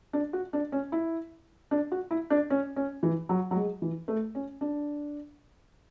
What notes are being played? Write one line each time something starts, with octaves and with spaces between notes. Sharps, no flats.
D4
F#4
D4
C#4
E4
D4
F#4
E4
D4
C#4
C#4
E3
F#3
F#3
G#3
E3
A3
C#4
D4